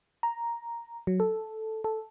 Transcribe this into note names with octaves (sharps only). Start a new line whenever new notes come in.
A#5
F#3
A4
A4